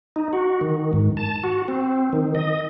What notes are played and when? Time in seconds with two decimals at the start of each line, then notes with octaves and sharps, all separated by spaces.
0.16 D#4
0.33 F#4
0.61 D#3
0.93 G#2
1.17 A5
1.44 F#4
1.68 C4
2.13 D#3
2.35 D#5